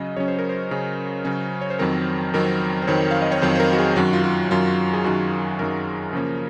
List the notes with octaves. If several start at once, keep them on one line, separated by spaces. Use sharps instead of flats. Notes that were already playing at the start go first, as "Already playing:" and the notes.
Already playing: C#3 F#3 C#4 D#5
C#3 F#3 C#4 C#5
C5
A#4
C5
C#3 F#3 C#4
C#3 F#3 C#4
C#5
C5
F2 D#3 F#3 C4 A#4
F2 D#3 F#3 C4 A#4
C5
F2 D#3 F#3 C4 C#5
F5
D#5
C#5
F2 D#3 F#3 C4 C5
C5
A#4
F#4
G#4
F#2 D#3 F#3 F#4
F4
F#4
F#2 D#3 F#3 F4
G#4
F#2 D#3 F#3 F#4
F#2 D#3 F#3 A#4
C#3 F3 A#3 C#4